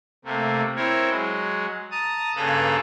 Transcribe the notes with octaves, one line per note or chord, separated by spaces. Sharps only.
C3 A3 A#3
C4 E4 A#4 C#5
F#3 G#3
A5 A#5 D#6
G2 C#3 A#3 A4 B4 A#5